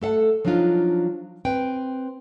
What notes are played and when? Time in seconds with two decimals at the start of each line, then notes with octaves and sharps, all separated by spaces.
0.02 A3 A4 F5 F#5 A5
0.45 F3 F#3 D4 D#4 F4
1.45 C4 B4 G5